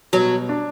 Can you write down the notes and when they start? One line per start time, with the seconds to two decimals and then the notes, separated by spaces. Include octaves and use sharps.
0.13 B2 F#3
0.49 D4